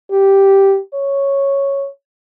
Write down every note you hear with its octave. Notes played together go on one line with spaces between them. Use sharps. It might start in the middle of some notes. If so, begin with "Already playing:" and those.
G4
C#5